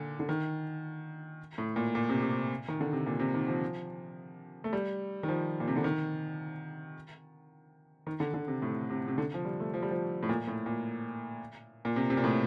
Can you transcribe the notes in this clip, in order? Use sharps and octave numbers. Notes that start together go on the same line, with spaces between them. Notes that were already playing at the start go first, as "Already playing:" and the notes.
Already playing: A#2 D3
D3
D#3
A2
A#2
A#2
C3
C3
D#3
D3
C3
A#2
C3
D#3
F3
A3
G3
D#3
F3
A#2
C3
D3
D#3
D#3
D3
D3
C3
A2
C3
C3
D3
F3
G3
A3
F3
G3
F3
A2
A#2
A2
A#2
A#2
C3
C3
A#2
A2